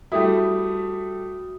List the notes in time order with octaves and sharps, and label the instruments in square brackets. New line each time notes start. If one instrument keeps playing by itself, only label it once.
[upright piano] G3 A3 E4 [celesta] F#4 D#6